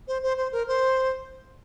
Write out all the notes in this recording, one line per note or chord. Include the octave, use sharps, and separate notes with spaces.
C5
C5
C5
A#4
C5